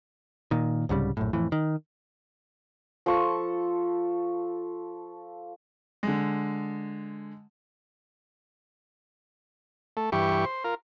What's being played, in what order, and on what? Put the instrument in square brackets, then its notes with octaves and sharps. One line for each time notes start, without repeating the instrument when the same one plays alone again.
[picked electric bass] A#2 D#3
C2 G#2 C#3 G3
A#1 F#2 A2
F2 A2 E3
D#3
[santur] F3 A4 C#6
[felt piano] D3 G#3
[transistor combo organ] A3
G2 E3 G4 C#6
C5
F4 A#4